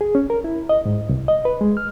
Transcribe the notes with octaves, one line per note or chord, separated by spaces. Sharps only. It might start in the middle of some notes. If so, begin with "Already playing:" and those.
G#4
C#4
A#4
E4
D#5
G#2
C2
D#5
B4
G#3
F6